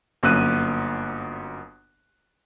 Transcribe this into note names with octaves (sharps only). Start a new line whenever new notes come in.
G1 F#2 A#3 E6 F#6 D#7